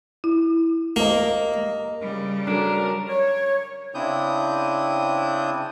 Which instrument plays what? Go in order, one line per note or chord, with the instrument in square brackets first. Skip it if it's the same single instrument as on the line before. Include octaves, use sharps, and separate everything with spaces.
[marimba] E4
[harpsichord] A#3 [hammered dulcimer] A#4 D#5
[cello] C#3 G3
[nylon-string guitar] F#3 C#4 A4 [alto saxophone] D4 [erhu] A#4
[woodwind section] C#5
[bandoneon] C#3 C4 D4 E4 D#6 G6